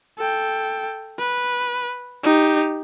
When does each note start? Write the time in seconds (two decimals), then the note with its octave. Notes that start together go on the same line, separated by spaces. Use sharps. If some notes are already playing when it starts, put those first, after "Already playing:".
0.18 A4 G5
1.19 B4
2.24 D#4 G4